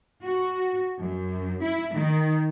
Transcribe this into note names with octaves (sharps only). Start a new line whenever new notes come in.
F#4
F#2
E4
D#3